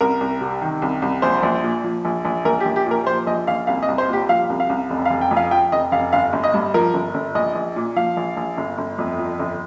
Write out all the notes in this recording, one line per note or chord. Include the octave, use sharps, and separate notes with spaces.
C2 A#4
C2
C3
D#3
C2
C2
A#1 C5
A#1
A#2
F3
A#1
A#1
A#1 A#4
G4
A#1
G4
A#2
A#4
F3 C5
A#1 D#5
A#1 F5
C2 F5
D#5
C2
C5
A#2 G4
F3 F5
C2
F5
C2
F1
F5
F1
G5
F2
F5
F3 G5
F1 D#5
F1 F5
G1 F5
G1
D#5
G2
F3 A#4
G1
G1
A#1 D#5
A#1
A#2
F3 F5
A#1
A#1
G1
G1
F2
F3
G1